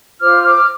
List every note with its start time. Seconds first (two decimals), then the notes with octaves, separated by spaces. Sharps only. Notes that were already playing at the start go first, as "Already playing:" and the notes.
0.21 F4 C5 D6 F6
0.43 D6 F6
0.56 F6